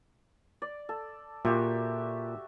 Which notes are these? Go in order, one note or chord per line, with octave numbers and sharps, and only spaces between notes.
D5
A4
A#2 F#4 G4 E5